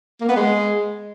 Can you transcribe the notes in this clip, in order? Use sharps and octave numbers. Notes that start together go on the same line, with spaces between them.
A#3
B3
G#3